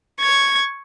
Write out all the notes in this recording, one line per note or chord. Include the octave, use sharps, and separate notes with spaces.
C#6 G#6